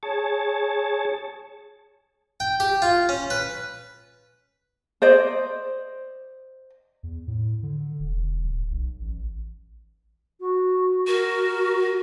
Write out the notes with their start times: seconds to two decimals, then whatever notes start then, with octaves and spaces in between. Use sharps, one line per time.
0.03 G#4 C#5 A5
2.40 G5
2.60 G4
2.82 F4
3.09 C#4
3.30 B4
5.02 C5 D5 D#5
7.03 E2
7.27 A2
7.63 D3
7.99 E1
8.44 D1
8.71 B1
9.01 A1
10.40 F#4
11.07 F#4 A#4